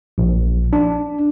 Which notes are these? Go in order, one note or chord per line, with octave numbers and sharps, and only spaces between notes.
A#1
D4